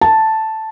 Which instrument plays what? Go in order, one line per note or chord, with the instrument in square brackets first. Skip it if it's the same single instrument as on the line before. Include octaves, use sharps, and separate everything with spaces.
[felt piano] A5